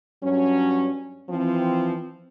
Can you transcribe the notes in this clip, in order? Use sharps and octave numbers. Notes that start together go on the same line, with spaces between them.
G2 F#3 C#4
E3 F3 C4